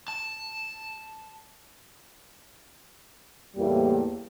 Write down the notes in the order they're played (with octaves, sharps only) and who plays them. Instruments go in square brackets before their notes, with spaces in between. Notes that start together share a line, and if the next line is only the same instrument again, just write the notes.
[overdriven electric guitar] A5
[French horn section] E2 A2 G3 A#3